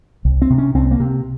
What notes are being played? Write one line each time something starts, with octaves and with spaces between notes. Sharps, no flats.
C2
C4
C3
C#4
C2 C4
A#3
C3